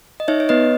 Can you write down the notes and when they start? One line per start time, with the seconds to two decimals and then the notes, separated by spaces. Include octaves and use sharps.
0.20 D#5
0.28 D#4 C#5 E5
0.40 C#5
0.49 B3 B4 D#5